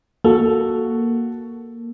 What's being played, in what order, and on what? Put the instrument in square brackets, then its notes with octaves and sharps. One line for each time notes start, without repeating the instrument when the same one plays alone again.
[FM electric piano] A#3 [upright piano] F#4 A4